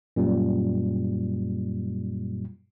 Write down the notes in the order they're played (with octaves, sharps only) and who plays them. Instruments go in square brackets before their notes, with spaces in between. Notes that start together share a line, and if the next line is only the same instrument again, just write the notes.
[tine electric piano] F#2 A#2 G3